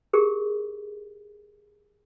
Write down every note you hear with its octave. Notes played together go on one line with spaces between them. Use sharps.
G4 G#4 A#4